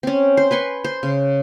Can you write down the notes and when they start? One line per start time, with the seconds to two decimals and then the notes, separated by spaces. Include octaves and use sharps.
0.03 C4 C#4
0.37 C5
0.51 B4 G#5 C6 C#6
0.84 C5
1.03 C#3